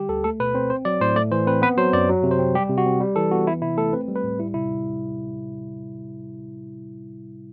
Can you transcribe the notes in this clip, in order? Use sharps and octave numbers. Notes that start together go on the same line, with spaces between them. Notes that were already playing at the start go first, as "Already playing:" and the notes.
Already playing: D3 G3 G4
D2 A4
A3 A4
B2 B4
C4 C5
C4 C5
F#3 D5
A2 C5
A3 D5
E3 C5
C4 B4
B3 B4
F#3 C5
F#2 D5
F#3
C3
C5
C4
G3 G4
C3
F#4
C4
G3
E3 A4
B3 F#4
E3 E4
C3 E4
A3 A4
C4 B4
G3
B4
A2
G3 E4
C3 E4